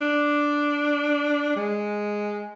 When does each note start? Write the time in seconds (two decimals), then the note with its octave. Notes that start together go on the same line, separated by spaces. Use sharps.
0.01 D4
1.56 G#3